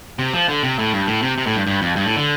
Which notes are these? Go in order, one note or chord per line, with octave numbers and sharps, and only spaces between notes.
C3
F3
D3
C3
A2
G2
A2
C3
C3
A2
G2
G2
F2
G2
A2
D3